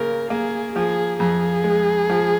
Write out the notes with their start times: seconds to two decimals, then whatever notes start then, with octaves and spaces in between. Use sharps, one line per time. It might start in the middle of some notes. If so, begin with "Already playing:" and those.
Already playing: C#3 A#3 A#4
0.30 A#3 G#4
0.75 F3 G#4
1.20 F2 G#4
1.64 G#3
2.10 F3